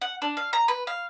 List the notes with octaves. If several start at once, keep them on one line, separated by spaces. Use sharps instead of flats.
F#5
D4
F5
A#5
B4
F5